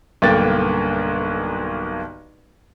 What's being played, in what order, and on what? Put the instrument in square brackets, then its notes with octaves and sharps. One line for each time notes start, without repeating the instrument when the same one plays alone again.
[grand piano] B1 G2 D3 A#3 G5 A6